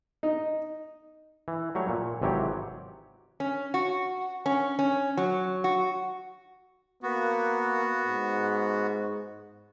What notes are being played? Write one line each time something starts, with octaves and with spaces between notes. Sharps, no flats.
D#4
E3
F#3 G3 A3 C#5
A#2
G#1 C3 E3 F#3 G4 C#5
C#4
F#4
C#4
C#4
F#3
F#4
A#3 B3 F#4
G#2